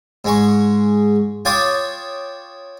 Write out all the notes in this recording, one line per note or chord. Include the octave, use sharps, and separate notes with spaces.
G#2 G#3 C#6
F4 C#5 G5 A5 D6 D#6